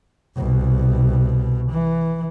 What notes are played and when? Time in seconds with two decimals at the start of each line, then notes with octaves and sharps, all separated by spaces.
0.36 C2 B2
1.72 E3